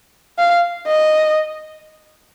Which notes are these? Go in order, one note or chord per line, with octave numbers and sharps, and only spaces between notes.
F5
D#5